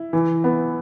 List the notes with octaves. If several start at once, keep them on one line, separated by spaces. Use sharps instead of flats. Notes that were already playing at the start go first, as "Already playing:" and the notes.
Already playing: E4
E3
B3